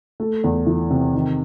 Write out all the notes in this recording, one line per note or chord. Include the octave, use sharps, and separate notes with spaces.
A3
E2
E3
C3
D#3